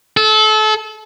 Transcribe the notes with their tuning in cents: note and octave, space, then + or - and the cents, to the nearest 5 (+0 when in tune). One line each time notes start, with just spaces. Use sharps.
A4 -30